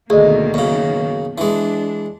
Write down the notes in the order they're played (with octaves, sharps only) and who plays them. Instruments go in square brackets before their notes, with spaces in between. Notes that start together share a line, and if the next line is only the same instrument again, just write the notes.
[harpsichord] D2 [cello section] B2 D#3 A#3 [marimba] G#4 D#5
[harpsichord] F#2 C#3
[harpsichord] E3 G#3 [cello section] D4